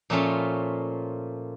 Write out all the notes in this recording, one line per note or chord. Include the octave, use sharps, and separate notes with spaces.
A#2 F3 A3 C#4 F4